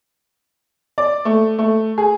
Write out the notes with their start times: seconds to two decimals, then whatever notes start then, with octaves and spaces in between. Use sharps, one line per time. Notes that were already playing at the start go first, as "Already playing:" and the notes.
0.98 D5
1.25 A3
1.58 A3
1.98 G#4